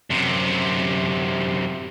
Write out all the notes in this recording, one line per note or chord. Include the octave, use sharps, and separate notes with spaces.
F#2 C3